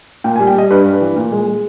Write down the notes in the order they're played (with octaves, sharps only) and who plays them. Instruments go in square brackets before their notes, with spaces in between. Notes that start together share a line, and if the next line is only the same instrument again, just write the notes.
[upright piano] A#2 G5
G#5
G3
G5
G3 D#5
G2 B4
G2
B4
E3
A#2
G#3
G#3